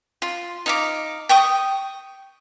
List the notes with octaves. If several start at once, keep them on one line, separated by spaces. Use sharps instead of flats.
F4
D#4 F5 D6
G5 C#6 D#6